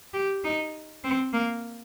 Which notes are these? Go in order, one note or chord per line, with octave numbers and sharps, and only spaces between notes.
G4
D#4
C4
A#3